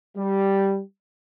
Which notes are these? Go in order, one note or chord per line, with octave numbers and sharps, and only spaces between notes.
G3